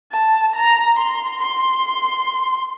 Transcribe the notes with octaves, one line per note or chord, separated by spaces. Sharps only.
A5
A#5
C6
C6